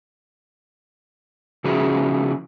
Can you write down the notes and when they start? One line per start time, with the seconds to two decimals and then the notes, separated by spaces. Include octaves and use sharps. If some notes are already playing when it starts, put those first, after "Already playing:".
1.64 C#3 F3 C#4 E4 F#4 G#4